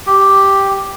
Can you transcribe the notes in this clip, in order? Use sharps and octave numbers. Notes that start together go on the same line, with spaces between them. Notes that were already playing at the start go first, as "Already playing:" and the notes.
G4